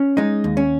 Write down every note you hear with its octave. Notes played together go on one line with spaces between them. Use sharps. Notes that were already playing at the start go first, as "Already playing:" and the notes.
Already playing: C#4
G#3 D#4
D#2
C#4